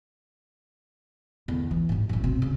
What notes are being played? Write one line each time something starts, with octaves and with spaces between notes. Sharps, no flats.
E2 D3
E3
A1 G#2
A1 F#2
B2 C4
C#3